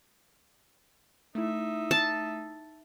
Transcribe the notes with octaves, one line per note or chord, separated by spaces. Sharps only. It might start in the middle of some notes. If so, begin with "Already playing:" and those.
A3 D#4 E4 E5
A5